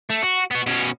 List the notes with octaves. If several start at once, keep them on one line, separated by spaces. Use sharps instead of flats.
A3
F#4
B3 F#4
B2 C#4